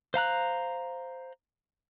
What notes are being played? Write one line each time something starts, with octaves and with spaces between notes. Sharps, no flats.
C5 F5 A#5 F#6